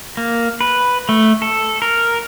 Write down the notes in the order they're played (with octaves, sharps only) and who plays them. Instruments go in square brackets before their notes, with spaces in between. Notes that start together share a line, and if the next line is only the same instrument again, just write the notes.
[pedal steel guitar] A#3
B4
A3
A4
A#4